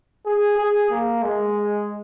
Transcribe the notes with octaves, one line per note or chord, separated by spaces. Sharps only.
G#4
G#4
A#3
G#3